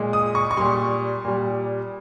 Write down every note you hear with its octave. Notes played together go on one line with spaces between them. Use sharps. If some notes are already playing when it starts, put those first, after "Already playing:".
Already playing: A#2 G#3
D#6
C#6
C#6
A#2 G3 C6
A#2 G3